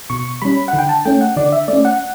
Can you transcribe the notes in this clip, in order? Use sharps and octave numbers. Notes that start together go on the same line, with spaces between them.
B2 C#6
G3 C#4 B5
F#5
D3
G5
A5
A3 C#4 G5
F#5
D3 D5
E5
A3 C#4 D5
F#5